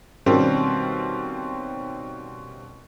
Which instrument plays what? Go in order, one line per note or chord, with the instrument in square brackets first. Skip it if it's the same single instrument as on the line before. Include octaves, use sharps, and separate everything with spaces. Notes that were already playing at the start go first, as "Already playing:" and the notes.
[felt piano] B2 D#3 G3 A#3 C4 C#4